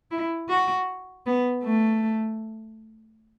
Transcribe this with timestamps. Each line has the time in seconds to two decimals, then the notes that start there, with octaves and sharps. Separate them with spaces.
0.11 E4
0.49 F#4
1.26 B3
1.64 A3